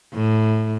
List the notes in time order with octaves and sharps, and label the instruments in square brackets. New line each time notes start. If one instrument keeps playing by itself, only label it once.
[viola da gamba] A2